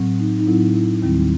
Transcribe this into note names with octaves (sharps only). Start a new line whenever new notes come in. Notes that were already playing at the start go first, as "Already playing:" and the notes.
Already playing: A2 F#3 C4
D#4
D#4
A2 F#3 C4 E4
E4
D#2 D#3 G3 C4 E4